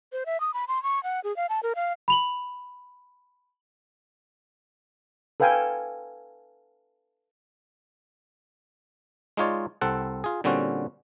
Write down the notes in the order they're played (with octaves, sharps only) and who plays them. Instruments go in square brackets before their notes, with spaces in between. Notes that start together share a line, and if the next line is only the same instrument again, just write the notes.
[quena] C5
E5
D#6
B5
C6
C#6
F#5
G#4
F5
A5
A#4
F5
[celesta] B5 F7 F#7
[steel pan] A4 B4 F5 G5 G#5
[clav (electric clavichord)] G#3 D#4 F4 C#5 D5
C2 C4 A4 F#5
F4 G#4
A#2 D3 G3 C4 C#4 F#4